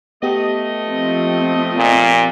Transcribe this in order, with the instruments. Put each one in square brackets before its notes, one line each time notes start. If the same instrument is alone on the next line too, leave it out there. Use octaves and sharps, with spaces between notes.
[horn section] A3 D#5 [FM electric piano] B3 G4
[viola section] F3 C4
[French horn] A#2